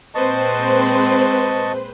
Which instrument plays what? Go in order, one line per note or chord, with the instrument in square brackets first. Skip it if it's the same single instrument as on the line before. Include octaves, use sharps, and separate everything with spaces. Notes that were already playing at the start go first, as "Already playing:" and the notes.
[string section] A#2 G#3 C4 [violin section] B4 C5 [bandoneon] D#5 A5 C#6